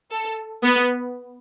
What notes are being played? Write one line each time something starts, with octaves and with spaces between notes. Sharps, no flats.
A4
B3 B4